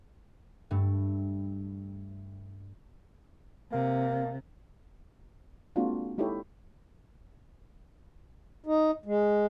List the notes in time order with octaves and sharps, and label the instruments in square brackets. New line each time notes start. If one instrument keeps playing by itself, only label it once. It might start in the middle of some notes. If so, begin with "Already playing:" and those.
[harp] G2 A3
[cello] C3 [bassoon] A#3
[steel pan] G#3 A#3 C4 D4 F4 F#4
G#3 D#4 E4 G4 A4 C#5
[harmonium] D#4
G#3